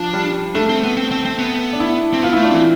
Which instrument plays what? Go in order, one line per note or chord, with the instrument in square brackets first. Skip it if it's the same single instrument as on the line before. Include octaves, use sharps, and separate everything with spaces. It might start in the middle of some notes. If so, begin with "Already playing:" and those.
Already playing: [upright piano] F3 [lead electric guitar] D4
[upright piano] G3
[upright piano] A3 [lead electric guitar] D4
[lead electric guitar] C4
B3
C4
C4
C4
B3
[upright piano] D4
E4
[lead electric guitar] C4
[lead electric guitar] B3 [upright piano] F4
[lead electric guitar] A3 [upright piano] E4
[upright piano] D4
[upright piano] E3 [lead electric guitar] C4